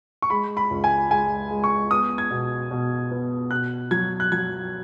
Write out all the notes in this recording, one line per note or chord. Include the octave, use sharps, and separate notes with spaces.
C#6
G#3 B5
B5
C#2
G#5
G#3 G#5
G#3
C#6
B3 D#6
G#6
B2
B2
B3
B2 F#6
F#3 G#6
F#6
F#3 G#6